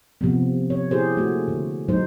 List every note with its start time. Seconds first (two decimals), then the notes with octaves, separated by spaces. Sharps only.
0.21 C3 F3 B3
0.70 C#5
0.91 E4 G4 G#4 C5
1.17 A3 A#3 F#4
1.48 D3
1.88 F#3 G#3 A3 D#4 C5